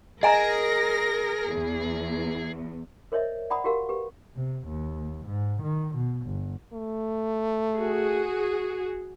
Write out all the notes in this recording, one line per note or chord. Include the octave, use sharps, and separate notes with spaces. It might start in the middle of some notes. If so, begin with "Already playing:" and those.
G#4 A#4 D#5 G#5 A#5 A#6
E2
A#4 C5 C#5 D#5 E5
D5 F#5 A#5 B5 D#6
F#4 G4 A#4 F5
G4 B4
C3
D#2
G#2
D#3
B2
G1
A3
F#4 G#4